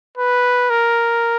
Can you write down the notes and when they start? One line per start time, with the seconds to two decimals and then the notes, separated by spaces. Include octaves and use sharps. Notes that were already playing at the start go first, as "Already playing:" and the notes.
0.18 B4
0.70 A#4